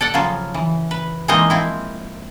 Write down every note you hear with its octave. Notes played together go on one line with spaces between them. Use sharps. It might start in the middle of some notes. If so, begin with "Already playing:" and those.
A4 D5 F#5
C#3 F3 F#3 F4
E3
B4
E3 G#3 A#3 C4 D#4 D#5
F3 C4 E4